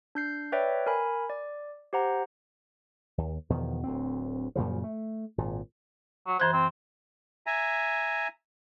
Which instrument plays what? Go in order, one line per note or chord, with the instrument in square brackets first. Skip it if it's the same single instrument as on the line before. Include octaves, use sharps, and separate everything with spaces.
[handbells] D4 G6 C7
B4 C#5 D5 E5 G5
A#4 G#5 B5
D5
G4 C5 F#5 A#5
[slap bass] D#2
E2 B2 D#3 F3
D1 D2 C4
F#2 A#2 C#3 F3
A3
G#1 A#2
[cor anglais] F#3
[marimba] F#2 E3 F#6 [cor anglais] C5
[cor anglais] C4
[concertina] E5 G#5 A#5